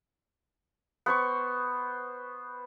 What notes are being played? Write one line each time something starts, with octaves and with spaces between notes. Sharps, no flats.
B3 C5 C#6